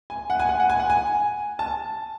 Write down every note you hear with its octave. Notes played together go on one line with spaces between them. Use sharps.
G#5
F#5
G#5
F#5
F#5
G#5
F#5
G#5
A5